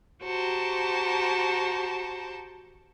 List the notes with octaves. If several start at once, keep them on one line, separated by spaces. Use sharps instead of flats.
F#4 G4 C5 A5 A#5